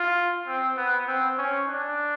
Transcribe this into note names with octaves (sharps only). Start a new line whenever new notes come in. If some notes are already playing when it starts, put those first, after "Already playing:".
Already playing: F4
C4
B3
C4
C#4
D4